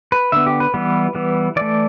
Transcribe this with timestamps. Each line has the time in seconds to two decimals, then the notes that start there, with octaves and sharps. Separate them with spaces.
0.12 B4
0.32 D3 B3 E5
0.47 G4
0.60 B4
0.74 E3 G3 B3
1.15 E3 G3 B3
1.56 E3 A3 D5